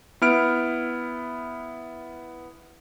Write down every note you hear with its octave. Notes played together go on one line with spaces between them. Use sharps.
B3 E4 F6 D7